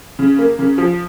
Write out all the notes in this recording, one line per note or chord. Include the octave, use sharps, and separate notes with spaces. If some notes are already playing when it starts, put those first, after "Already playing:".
C#3
A#3
C#3
F3